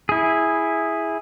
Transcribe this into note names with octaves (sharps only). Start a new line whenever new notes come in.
E4 G#4